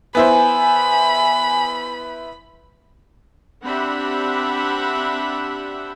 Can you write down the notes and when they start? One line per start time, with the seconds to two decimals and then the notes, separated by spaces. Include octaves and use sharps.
0.15 B3 E4 C5 G#5 B5
3.65 C4 D4 G4 E5 F#5 B5